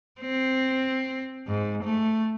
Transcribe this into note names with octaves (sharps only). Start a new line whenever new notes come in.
C4
G#2
A3